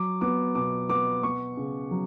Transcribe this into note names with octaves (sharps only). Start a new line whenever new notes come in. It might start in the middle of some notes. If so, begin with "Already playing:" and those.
Already playing: F#3 D6
B3 D6
B2 D6
B3 D6
B3 C#6
C#3
F#3